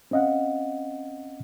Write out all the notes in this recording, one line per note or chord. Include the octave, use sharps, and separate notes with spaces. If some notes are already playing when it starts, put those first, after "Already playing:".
C4 C#4 D#5 F5 F#5